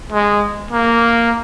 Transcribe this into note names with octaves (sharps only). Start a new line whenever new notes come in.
G#3
A#3